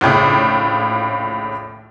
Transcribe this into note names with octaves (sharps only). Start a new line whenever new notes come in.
A#1 D#2 A2 C#3